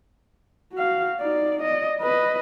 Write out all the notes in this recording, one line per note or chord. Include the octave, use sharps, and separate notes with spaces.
F#4 F5
D#4 D5
D5 D#5
B4 D#5